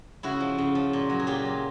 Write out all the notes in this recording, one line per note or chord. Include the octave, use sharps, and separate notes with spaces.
C#3 E4 F#4
F3
C#3
F3
A#2
F#3
G#4
A#2 F4 G4
F#3